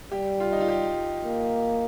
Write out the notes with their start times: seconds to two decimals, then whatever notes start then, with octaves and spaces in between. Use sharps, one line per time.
0.12 G3 G4
0.40 F4
0.52 D#4
0.60 F4
0.68 G4
1.25 A#3